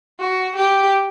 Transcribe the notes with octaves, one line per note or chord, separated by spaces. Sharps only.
F#4
G4